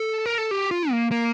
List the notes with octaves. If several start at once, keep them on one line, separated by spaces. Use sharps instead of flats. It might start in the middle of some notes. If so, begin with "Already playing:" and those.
Already playing: A4
A#4
A4
G4
F4
A#3
A#3